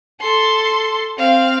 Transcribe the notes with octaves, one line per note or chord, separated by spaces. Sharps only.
A4 C6
C4 F5